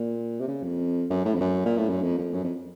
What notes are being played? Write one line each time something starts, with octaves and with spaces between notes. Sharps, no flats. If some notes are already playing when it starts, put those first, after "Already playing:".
Already playing: A#2
C3
C#3
F2
F#2
A2
F2
F#2
A#2
A2
F#2
F2
F2
F#2
F2